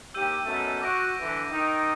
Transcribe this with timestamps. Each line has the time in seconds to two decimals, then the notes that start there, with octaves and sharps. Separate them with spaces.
0.14 D#2 G4 E6 G6 D#7
0.44 F#2 B2 A3
0.81 F#4 D6 A#6 D7
1.19 D3 E3
1.50 D#3 D#4